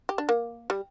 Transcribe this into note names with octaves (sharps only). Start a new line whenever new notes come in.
G4
D4
A#3
G3